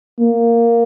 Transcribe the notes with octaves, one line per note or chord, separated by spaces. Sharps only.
A#3